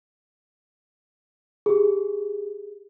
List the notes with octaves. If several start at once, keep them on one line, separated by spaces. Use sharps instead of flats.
G4 G#4